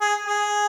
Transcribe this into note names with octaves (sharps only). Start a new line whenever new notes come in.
G#4
G#4